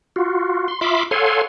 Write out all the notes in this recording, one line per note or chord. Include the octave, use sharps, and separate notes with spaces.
F4 F#4
C6
F4 E5 B5 C6 D6
A4 C#5 F5 F#5 G#5 C6